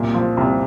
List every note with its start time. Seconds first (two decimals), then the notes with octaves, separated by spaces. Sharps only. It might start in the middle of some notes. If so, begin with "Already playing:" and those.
Already playing: C2 A#2
0.14 F3
0.37 C2